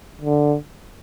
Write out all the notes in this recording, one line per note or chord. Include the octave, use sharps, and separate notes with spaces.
D3